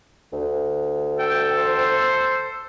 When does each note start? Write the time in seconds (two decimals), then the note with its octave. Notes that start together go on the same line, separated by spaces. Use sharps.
0.33 D2
1.19 A4 G5
1.58 C5